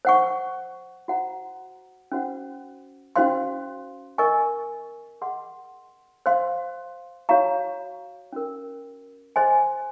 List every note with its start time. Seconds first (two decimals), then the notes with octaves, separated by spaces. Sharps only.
0.05 C5 F#5 C#6
1.08 F#4 C5 F#5 A#5
2.12 C#4 F#4 C5 F#5
3.16 C#4 F#4 C5 F5 C6
4.18 A#4 D#5 G#5 C#6
5.22 G#4 D#5 F#5 C6
6.26 C5 F5 C6
7.29 F#4 C#5 F5 A#5 C#6
8.33 C#4 F#4 A#4
9.36 G#4 C5 D#5 G#5 C6